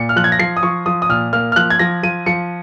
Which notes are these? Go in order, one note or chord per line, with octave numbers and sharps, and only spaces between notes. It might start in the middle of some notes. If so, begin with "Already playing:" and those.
Already playing: A#2 C#7
F6
F3 F#6
G#6
A#6
F3 C7
D#6
F3 C#6
F3 D#6
D#6
A#2 F6
A#3 F6
F6
F3 F#6
G#6
F3 A#6
F3 D#7
F3 C#7